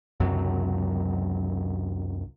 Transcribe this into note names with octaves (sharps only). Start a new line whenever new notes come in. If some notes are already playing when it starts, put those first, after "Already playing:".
C#2 F#2 C3 F#3